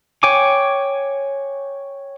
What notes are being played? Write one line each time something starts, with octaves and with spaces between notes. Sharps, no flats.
C#5 G5 G#5 D6